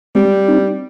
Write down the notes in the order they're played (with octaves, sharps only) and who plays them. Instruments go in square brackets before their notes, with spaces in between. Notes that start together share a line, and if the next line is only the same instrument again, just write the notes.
[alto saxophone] G3 [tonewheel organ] G#3 C4
[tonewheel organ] C4 D#4